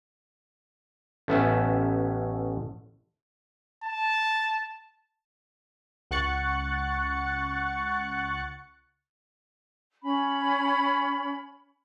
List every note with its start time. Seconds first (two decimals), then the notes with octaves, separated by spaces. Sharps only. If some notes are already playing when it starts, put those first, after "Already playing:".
1.28 A1 A3 B3 C#4 E5
3.84 A5
6.11 C#2 F#5 C#6 F#6 A6 C#7
10.03 C#4 B5